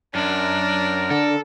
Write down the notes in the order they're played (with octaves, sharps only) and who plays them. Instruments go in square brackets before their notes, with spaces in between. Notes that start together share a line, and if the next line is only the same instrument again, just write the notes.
[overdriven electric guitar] F#2 [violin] D4 [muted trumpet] A#4
[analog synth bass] D3 [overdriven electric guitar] A4